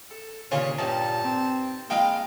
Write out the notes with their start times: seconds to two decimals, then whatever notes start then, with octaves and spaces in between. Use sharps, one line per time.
0.11 A4
0.51 D#2 A#2 C#3 D4 F4 G#4 A#4 C#5
0.78 G2 D#4 F4 G4 A5
1.25 C4
1.90 G#3 A#3 F4 D#5 F5 G5 B5 F6